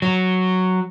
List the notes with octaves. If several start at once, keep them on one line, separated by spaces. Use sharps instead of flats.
F#3